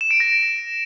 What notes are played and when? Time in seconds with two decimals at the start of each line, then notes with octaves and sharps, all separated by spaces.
0.01 E7
0.11 D7
0.20 A#6